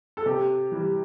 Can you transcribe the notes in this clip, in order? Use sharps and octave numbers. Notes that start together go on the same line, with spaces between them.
A4
C3 G4
E3 G3